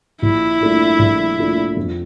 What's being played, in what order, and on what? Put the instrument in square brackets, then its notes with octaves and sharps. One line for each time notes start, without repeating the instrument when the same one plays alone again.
[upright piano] A#1 [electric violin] E4
[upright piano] A#2 A3 D4
A#1
A#2 A3 D4
F2